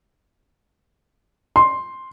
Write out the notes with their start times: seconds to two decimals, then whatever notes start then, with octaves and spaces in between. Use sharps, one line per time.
1.56 C6